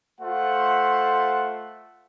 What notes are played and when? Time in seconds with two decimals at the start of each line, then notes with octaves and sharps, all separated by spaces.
0.20 A3 F4 C5 F#5